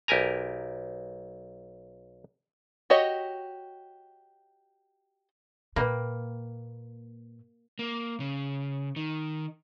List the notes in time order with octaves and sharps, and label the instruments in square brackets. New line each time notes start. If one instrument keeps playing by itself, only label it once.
[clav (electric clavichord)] B1 G4 A#4 G#5 A#5
[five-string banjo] F#4 G4 C#5 D#5
[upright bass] A#2 [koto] A#3 [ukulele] B4 G5 B5
[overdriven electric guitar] A#3
C#3
D#3